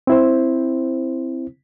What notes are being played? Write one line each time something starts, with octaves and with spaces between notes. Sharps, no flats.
C4 E4 C5